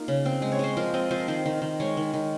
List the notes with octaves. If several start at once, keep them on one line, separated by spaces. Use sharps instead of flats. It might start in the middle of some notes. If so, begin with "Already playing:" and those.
Already playing: A#3 D#4 F4
C#3
C4
G#3
C#5
G#3 C5
F3 A#4
C4 D#5
F3 C5
A#4
D#3 C5
D#3
D#3
G#3 C#5
D#3
D#3